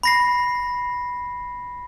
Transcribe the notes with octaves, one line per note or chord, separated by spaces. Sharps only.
B5 A#6 C7